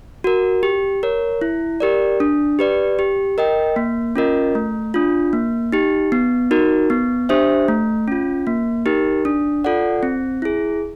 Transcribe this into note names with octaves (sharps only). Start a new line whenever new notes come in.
F#4 A#4
G4
A#4 C#5
E4
G4 A#4 D5
D4
G4 B4 D5
G4
A#4 D#5 G5
A#3
C#4 F4 A#4 D#5
A3
D4 F4
A#3
D#4 G4
B3
D#4 F#4 A#4
B3
D4 G4 C5 E5
A3
C#4 F4
A#3
D#4 G4 A#4
D4
F4 A4 D5 F#5
C4
E4 G#4